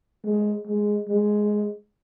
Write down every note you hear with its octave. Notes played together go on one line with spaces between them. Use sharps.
G#3
G#3
G#3